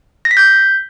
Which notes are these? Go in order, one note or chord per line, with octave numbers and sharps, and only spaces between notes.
A#6
B6
G6